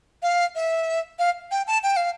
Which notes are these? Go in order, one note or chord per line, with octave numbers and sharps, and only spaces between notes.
F5
E5
F5
G5
A5
G5
F5